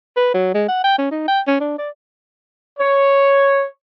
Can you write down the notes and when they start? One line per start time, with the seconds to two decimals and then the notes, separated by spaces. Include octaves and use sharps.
0.17 B4
0.34 F#3
0.54 G#3
0.68 F#5
0.84 G5
0.98 C#4
1.11 D#4
1.28 G5
1.47 C#4
1.61 D4
1.79 D5
2.79 C#5